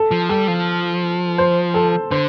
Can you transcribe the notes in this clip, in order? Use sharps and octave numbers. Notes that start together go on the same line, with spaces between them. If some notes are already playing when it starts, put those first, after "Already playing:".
Already playing: A4
F3
G3 A4
F3
C5
A4
D3 C5